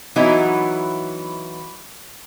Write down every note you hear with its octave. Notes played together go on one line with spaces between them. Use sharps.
E3 F#3 B3 D#4 E4